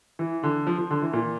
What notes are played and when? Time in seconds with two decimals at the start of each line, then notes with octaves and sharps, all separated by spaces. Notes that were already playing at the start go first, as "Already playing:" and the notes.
0.19 E3
0.43 D3
0.67 F3
0.78 F3
0.91 D3
1.02 E3
1.13 A#2